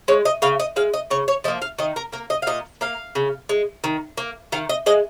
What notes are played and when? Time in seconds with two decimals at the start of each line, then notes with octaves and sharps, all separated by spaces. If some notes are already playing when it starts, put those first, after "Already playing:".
0.08 G#3 C#5
0.25 D#5
0.42 C#3 F5
0.60 D#5
0.76 G#3 F5
0.94 D#5
1.10 C#3 C#5
1.28 C#5
1.44 F3 D#5
1.48 A#3
1.62 F5
1.78 D#3 D#5
1.96 A#4
2.12 A#3 A#4
2.30 D#5
2.42 F5
2.47 A#2 D#5
2.81 A#3 F5
3.15 C#3
3.49 G#3
3.84 D#3
4.17 A#3
4.52 D#3 F5
4.69 D#5
4.86 G#3 D#5